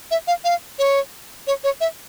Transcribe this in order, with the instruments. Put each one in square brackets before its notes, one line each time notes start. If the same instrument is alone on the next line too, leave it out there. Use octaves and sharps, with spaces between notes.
[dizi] E5
F5
F5
C#5
C#5
C#5
E5